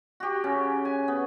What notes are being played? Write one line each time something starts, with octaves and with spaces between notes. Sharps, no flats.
F#4 G4
C#3 C#4
G#5
B3